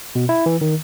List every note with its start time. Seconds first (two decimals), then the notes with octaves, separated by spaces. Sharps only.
0.15 B2
0.29 E4
0.46 E3
0.61 D#3